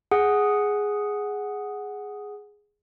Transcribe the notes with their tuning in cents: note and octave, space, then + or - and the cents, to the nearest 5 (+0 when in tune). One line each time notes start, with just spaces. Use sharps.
G#4 +0 F#5 +0 D#6 +0